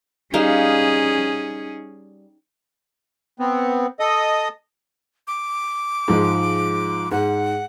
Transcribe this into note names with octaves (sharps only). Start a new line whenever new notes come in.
G3 C#4 D#4 G#4 F5
B3 C4
A4 D#5 D#6
D6
G#2 F3 G#3
G#2 F#5